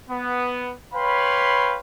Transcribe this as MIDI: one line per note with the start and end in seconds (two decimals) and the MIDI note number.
0.10 0.73 59
0.94 1.79 71
0.94 1.79 73
0.94 1.79 77
0.94 1.79 79
0.94 1.79 83
0.94 1.79 84